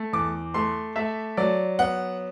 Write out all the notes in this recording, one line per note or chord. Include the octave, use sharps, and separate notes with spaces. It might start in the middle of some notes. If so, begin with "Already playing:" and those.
Already playing: A3
E2 D6
A3 C6
A3 E5
F#3 D5
B3 F#5